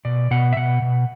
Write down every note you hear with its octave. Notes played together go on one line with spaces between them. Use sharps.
B2 D5
B2 F#5
E5
B2 F#5
B2